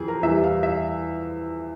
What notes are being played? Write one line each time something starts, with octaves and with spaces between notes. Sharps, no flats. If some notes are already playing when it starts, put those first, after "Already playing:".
Already playing: F2 E3 G#4
A#4
E2 E3 G3 E5
F5
E5